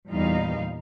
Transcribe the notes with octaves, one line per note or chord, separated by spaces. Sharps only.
E2 A#2 E3 G3 D#4 F5